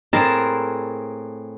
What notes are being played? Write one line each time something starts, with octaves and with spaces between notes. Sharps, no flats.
A2 C4 G#4 A#4 B4 A5